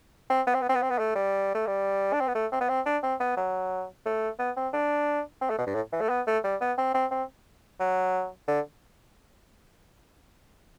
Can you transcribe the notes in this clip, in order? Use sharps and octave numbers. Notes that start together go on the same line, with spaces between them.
C4
B3
C4
B3
C4
B3
C4
B3
A3
G3
A3
G3
D4
C4
B3
A3
C4
B3
C4
D4
C4
B3
F#3
A3
B3
C4
D4
C4
A3
B2
G2
A2
E3
A3
B3
A3
G3
B3
C4
C4
C4
F#3
D3